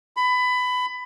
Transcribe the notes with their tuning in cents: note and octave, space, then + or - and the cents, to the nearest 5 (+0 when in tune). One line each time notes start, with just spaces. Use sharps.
B5 +20